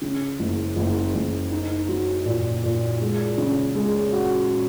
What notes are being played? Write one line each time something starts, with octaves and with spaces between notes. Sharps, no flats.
C#3
F#1
F#1
F#1
D#4
F#3
A#2
A#2
G#3
C#3
G#3
F#4